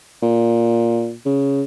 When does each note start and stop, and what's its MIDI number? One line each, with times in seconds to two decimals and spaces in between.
0.22 1.14 46
1.26 1.63 49